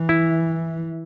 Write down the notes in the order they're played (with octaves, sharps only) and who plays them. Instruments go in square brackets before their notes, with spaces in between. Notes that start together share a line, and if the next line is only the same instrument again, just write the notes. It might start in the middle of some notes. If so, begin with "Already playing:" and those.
Already playing: [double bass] E3
[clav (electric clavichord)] E4